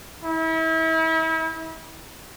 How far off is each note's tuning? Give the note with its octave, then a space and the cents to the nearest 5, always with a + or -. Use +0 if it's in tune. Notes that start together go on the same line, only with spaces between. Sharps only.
E4 -35